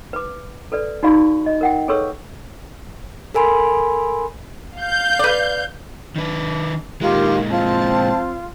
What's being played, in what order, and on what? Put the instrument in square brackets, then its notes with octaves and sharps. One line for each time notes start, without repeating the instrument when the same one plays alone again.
[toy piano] B4 D6
A4 B4 D5
D#4 F#4 D5 F5 B5 C#6
D#5
A#4 F#5 G5
G#4 A4 B4 C#5 C#6 E6
[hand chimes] A4 A#4 G#5 B5 C6
[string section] F5 G6
[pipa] B4 D5
[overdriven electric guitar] D#3 B4 [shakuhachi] D4
[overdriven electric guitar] A#2 G#3 [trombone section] D#3 [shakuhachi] F4 [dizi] G4
[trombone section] F3 C4 [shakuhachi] F4 [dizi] A5